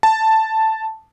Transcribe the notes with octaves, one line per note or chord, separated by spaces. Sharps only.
A5